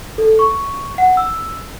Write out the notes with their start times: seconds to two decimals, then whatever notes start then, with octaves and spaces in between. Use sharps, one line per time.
0.18 A4
0.39 C#6
0.98 F#5
1.17 E6